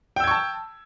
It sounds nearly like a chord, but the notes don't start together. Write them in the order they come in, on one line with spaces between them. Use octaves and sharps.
G5 E6 G#6 C#6 A5